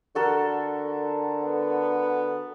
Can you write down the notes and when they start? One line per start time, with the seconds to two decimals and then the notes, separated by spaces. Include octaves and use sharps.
0.15 D3 F#4 A4 A#4
1.43 B3